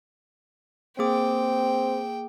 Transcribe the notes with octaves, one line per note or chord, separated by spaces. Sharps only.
A#3 C4 G#4 G5 D6